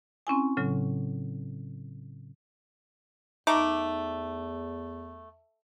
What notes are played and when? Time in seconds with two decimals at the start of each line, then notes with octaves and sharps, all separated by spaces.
0.27 C4 C#4 E4 G#5
0.57 A2 C#3 F#3
3.47 E2 A3 D#4 D6